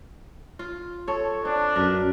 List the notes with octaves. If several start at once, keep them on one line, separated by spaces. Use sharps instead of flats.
F4
A4 C#5
C4 D4
F#2 A#4 B4